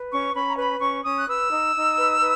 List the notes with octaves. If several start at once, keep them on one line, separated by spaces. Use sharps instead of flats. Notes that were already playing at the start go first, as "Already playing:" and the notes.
Already playing: B4
C#4 C#6
C#4 B5
A#5
B4 B5
C#4 C#6
C#4 D#6
F#6
B4 E6
D#4
D#4
B4
B4